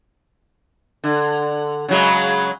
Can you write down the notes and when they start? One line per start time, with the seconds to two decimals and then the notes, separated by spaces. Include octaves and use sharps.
1.04 D3
1.88 C#3 F#3 G#3